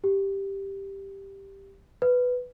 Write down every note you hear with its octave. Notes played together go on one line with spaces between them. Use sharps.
G4
B4